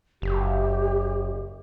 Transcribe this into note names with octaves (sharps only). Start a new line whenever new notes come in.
F#1 G4